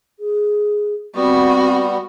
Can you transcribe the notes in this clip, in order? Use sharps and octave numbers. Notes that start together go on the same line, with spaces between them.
G#4
G3 B3 C4 F#4